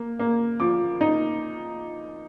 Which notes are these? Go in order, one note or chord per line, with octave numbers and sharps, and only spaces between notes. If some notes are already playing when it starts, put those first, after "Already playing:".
Already playing: A#3
A#3
F3 D6
D#4